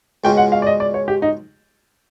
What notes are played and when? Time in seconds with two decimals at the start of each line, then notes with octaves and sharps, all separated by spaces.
0.24 C#2 B2 G#3 C#4 F4 G5
0.37 F#5
0.52 F5
0.62 D5
0.66 D#5
0.80 D5
0.94 C#5
1.08 G4
1.22 D#4